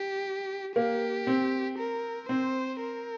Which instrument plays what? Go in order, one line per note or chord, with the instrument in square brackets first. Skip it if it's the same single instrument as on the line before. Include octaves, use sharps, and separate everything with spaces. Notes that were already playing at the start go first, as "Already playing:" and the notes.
Already playing: [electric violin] G4
[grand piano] A#3 [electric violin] G4
[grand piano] C4
[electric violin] A#4
[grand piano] C4 [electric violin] C5
[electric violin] A#4